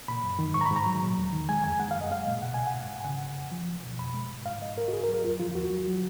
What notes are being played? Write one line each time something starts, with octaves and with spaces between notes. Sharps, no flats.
A#2 B5
F#2
D#3
G#2 C#6
A#5
B5
G#2
A#5
F#3
A#2
D#2
D#3
G#3 G#5
F2 G#5
G#3 F#5
F5
F#2
D#5
G#3 F5
A#2
B2 F#5
C#2 G#5
F#5
G#2
G#2
G#5
C#3 F#5
C#3
F2
F3
C#2
B2
F2 B5
G#3
G#2
G#2 F5
G#2 D#5
G#2 A#4
F#4
G#2 G#4
A#4
F#3
A#4
F2 F4
F3 F4
F4
D#2 F#4
F#3
F#3